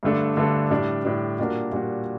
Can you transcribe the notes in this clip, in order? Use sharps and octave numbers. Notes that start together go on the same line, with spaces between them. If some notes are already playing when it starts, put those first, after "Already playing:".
G2 D3 A3 D4 A4
G2 D3 A3 D4 A4
A2 G3 D4
A2 G3 D4
A#2 G3 D4 F#4 A#4
A#2 G3 D4 F#4 A#4